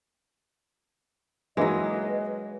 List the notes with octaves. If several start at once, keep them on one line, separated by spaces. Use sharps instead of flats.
E3 F#3 G#3 A#3 D#4 B4 D#5